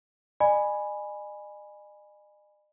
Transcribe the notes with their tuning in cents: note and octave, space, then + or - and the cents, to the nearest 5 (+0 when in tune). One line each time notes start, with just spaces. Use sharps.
D#5 -45 G#5 +0 B5 +0